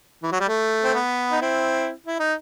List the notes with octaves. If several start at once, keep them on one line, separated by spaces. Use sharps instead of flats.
E3
F#3
G3
A3
C4
B3
D#4
C4 E4
E4
D#4